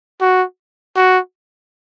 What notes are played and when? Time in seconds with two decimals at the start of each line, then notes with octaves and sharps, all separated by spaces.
0.21 F#4
0.96 F#4